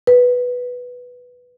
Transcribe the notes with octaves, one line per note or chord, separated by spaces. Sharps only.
B4